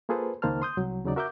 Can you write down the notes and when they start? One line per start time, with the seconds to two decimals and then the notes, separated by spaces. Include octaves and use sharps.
0.09 A#3 F4 G#4 A4 B4 C5
0.42 C#2 D#3 A#3 C5 A5 F6
0.62 C6 D#6 G6
0.77 C2 F#3
1.04 D#2 C#3 F#3 D#4 D5
1.16 F#4 A#4 E5 F#5 D6 G6